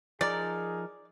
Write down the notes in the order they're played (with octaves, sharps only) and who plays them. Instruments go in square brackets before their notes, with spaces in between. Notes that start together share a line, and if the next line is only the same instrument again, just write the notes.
[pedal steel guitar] F3 D#4 A#4 [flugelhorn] G#4 [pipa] D5